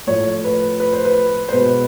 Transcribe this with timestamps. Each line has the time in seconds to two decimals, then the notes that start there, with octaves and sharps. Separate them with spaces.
0.07 A2 F3 A3 C#5
0.44 B4
0.80 B4
0.93 C5
1.05 B4
1.49 C5
1.52 B2 G#3 B4